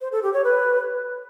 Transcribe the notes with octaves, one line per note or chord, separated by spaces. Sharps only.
C5
A4
G4
C#5
B4